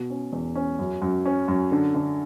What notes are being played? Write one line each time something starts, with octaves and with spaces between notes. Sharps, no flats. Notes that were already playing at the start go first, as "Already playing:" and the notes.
Already playing: B2
C#4
E2
C#4
F#2
F#2
C#4
F#2
D3
D3